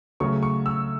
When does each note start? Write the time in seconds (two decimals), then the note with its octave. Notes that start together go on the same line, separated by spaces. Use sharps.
0.20 C#3 F#3 A3 C#6
0.43 C#6
0.66 E6